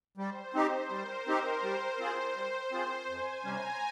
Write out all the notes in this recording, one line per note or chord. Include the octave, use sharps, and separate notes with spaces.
G3 C5
C4 D#4 G4 C5
G3 A#4
C4 D#4 G4
G3 C5
C4 F4 G#4
G3 C5
C4 F4 G#4
F2 G#5
C3 G3 C#4 A#5